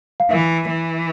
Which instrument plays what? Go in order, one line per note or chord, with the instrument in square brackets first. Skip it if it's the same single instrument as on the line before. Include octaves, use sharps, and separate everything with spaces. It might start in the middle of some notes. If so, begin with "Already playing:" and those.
[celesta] F5
[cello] E3 [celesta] E5
[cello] E3